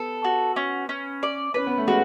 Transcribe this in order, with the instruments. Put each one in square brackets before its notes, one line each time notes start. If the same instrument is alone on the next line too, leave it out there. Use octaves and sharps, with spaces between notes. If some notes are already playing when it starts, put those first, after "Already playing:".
Already playing: [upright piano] B3 [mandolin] A4
[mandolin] F#4
C#4
C#4
D5
[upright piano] C#4 [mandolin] B4
[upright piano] B3
A3
[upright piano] G#3 [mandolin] F#4